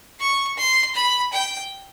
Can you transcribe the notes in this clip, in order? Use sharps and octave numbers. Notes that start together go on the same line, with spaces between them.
C#6
C6
B5
G5